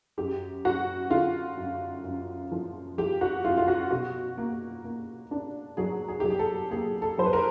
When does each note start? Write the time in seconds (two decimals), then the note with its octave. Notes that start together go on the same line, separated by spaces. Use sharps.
0.18 F#2 G4
0.65 F#2 F#4
1.10 D3 F4
1.57 F#2
2.04 F#2
2.52 F3
2.98 F3 G4
3.21 F#4
3.44 F#2 F4
3.58 F4
3.68 F#4
3.90 B2 F#4
4.38 A#3
4.85 A#3
5.31 D4
5.77 F#3 G#4
6.08 G#4
6.20 F#3 G4
6.30 G#4
6.39 A4
6.71 A#3 G#4
7.02 A4
7.18 F#3 C5
7.26 B4
7.33 A#4